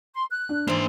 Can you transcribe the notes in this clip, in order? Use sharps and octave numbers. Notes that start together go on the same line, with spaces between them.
C6
F#6
D4
G#2 E3 A#3 C5